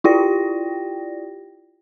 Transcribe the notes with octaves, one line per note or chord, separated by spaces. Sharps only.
E4 F4 G4 D5 G5 A#6